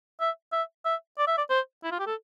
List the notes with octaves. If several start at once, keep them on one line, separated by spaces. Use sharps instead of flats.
E5
E5
E5
D5
E5
D5
C5
E4
F4
G4
A4